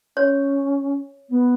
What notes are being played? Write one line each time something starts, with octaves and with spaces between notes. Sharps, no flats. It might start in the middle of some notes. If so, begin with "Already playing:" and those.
C#4 C#5
B3